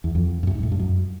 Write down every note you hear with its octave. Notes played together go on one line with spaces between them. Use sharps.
E2
F2
G2
F#2
G#2
A2
G2
F#2